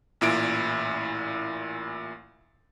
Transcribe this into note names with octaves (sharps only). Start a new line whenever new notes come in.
A1 A#2 E4 D7